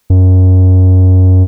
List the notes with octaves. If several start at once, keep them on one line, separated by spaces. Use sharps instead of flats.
F#2